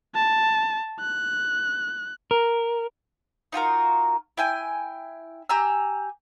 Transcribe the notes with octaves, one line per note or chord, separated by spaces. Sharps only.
A5
F#6
A#4
D#4 F4 F#4 A#4
E4 G5 G#5
G4 G#5 A#5 E6